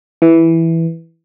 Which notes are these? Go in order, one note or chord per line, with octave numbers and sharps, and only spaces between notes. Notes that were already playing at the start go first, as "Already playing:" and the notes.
E3